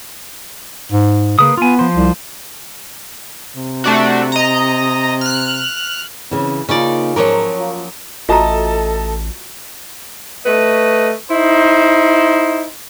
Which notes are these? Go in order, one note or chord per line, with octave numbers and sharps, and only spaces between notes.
G#2
C#3 A#3 B4 D#6
B3 F4 G#5
F3 C5
C2
C3
A3 D4 F#4
D#5 A#5
F6 F#6
C#3 E3 C4 C#4
C#3 A#3 C#4 D#4 F4 D5
G#2 F3 F#3 A#3 A#4 C#5
F4
A1 A3 F4 F#4 A4 D#5 A5 A#5
A3 B4 D#5
D#4 E4 C5